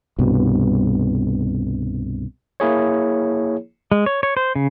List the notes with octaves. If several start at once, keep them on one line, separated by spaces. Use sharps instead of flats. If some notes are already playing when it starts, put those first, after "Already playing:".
C2 G2 B2
A#3 E4 G#4 C#5
G#3
C#5
C#5
C5
C#3